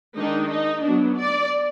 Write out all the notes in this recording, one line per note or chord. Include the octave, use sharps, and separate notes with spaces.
D#3 G#3 D4 D#4
D#4
F#3 B3 D4
D5